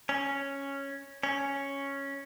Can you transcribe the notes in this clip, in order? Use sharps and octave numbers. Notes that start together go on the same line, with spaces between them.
C#4
C#4